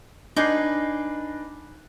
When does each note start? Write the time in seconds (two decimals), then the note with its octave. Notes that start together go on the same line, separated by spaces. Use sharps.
0.36 D4 D#4 B4 G#5 C7